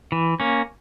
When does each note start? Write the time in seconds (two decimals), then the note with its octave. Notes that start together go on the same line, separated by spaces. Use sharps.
0.12 E3
0.40 A#3 C#4